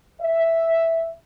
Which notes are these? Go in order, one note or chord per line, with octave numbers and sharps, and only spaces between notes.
E5